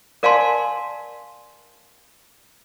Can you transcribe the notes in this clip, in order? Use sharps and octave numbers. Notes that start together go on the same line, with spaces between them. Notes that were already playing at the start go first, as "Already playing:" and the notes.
A#4 D5 F5 G#5 A5 C6